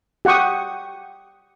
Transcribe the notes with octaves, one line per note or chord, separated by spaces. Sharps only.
G4 F#5 G5 C#6 D#6